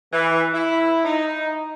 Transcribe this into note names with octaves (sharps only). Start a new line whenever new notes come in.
E3
E4
D#4